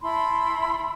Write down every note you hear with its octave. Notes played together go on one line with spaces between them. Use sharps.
E4 A5 B5 C6